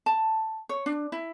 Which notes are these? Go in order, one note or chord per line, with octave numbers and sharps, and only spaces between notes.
A5
C#5
D4
E4